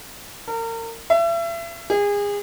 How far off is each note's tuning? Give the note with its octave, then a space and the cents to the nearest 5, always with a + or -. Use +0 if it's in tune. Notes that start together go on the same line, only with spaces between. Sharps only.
A#4 -35
E5 +35
G#4 -30